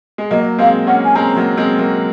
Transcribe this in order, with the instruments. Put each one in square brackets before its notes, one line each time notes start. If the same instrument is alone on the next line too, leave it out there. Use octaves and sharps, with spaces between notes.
[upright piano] G#3
[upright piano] F#3 A#3 [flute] D#5
[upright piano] G#3 C4 [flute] F5
[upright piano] A#3 C#4 [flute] F#5
[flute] G#5
[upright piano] G#3 C4 [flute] A#5
[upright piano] F#3 A#3
G#3 C4
F#3 A#3